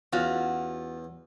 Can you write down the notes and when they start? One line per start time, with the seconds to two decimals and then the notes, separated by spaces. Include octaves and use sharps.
0.13 E2 C#4 F4 F#4